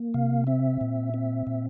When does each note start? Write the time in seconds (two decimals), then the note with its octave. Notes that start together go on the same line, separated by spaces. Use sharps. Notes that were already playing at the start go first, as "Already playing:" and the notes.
Already playing: A#3
0.14 C3 F5
0.47 C4 E5
0.81 A#2
1.14 C4
1.47 A#2